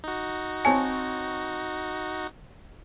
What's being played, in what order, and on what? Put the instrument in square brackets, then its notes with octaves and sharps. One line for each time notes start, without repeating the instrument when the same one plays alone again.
[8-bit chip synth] D#4 F#4
[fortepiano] C4 C#5 A5 [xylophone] G#5